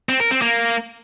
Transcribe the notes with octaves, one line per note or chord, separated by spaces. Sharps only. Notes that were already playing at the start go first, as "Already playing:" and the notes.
C4
A#4
C4
A#3